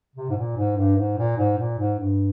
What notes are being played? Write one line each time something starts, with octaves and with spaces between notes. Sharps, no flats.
C3
G#2
A#2
G#2
G2
G#2
A#2
G#2
A#2
G#2
G2